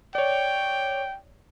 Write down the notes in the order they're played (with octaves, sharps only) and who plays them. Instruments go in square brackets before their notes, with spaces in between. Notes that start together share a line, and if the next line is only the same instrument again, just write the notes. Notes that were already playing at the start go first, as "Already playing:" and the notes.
[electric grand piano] C#5 D5 [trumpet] G5